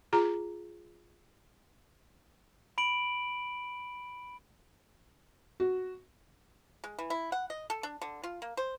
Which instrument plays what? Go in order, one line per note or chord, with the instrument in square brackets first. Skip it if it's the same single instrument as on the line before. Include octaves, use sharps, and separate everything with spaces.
[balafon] F4 G#4 A#5
[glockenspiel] B5 D7 F#7
[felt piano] F#4
[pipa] G#3
E3
E4
F#5
D#5
A4
D4
D3
F4
A#3
C5